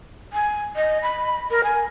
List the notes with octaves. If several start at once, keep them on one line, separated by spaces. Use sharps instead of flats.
G#5
D#5
B5
A#4
G#5